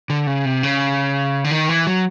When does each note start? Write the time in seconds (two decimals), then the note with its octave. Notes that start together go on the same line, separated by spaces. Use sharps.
0.10 D3
0.27 C#3
0.45 C3
0.63 C#3
1.44 D3
1.51 D#3
1.69 E3
1.87 F#3